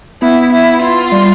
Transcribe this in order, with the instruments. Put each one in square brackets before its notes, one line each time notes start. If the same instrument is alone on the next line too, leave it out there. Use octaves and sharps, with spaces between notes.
[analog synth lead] B3 [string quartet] E4
[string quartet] E4
F4
[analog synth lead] G3